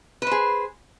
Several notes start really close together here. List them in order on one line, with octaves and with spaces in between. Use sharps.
B4 C5 G#4